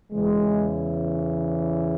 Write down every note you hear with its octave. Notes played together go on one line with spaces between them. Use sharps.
E2 C#3 E3 G#3